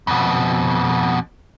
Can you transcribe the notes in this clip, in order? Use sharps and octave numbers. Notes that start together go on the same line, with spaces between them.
F2 B2